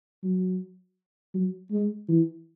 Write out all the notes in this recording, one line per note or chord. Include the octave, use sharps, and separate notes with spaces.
F#3
F#3
G#3
E3